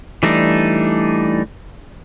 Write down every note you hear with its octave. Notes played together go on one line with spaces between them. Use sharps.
E3 G3 A3 D4 D#4